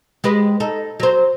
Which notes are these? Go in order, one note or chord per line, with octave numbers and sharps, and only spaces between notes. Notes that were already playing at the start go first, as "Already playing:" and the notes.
G#3 G4 B4
D#4 A4
F#3 C5